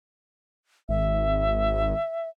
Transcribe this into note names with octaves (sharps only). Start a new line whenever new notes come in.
G#1 E5